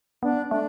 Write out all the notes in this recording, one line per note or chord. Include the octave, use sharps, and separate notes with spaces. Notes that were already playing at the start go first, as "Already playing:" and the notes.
B3 D4
A3 D4